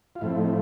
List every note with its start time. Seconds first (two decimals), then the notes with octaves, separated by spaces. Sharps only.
0.15 F4
0.21 A2 F3 A3 C4 E4
0.38 D#4
0.46 E4